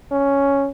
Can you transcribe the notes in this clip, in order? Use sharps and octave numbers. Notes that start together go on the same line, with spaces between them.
C#4